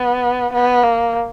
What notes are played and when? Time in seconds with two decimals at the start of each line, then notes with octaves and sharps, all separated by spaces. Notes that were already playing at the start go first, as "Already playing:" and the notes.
Already playing: B3
0.54 B3
0.83 A#3